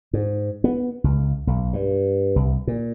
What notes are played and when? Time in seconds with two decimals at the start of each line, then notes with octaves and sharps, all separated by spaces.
0.13 G#2
0.64 B3
1.04 C#2
1.47 B1
1.73 G2
2.36 C2
2.67 A#2